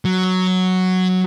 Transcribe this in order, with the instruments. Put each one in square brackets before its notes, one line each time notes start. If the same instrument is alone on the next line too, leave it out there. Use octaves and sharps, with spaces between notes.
[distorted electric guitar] F#3